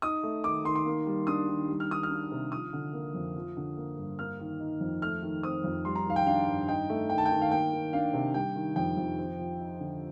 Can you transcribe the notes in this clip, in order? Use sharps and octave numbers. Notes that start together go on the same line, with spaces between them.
D#4 D#6
A3
D#3 D6
D#3 C6
C6
A#3
G3
D4 D#6
D#3
G3
F6
D#3 D#6
F6
D4
C3
F3 D#6
D3
A#3
F2
F3
D3
A#3
G2
A#3 F6
D#3
D#4
F2
A3 F6
D#3
C4 D#6
F2
G3 C6
A#5
D#3 F5
G5
D4 F5
G2
D#4 G5
A3
D#3 G5
A5
D#3 G5
F5
A#3 G5
D#3
D4 F5
C3
G3 G5
D#3
F2 G5
F2
C4
F3
D#4
D3